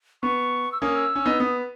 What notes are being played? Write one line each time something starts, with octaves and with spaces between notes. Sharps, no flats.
B3 C#6
E6
A#3 C#4 D#6
E6
C#4
B3 D#4
B3 D#6